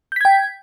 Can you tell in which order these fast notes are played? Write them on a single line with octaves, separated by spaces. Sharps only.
G6 B6 G#6 G5